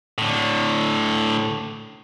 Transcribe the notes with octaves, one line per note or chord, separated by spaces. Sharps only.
A2 D3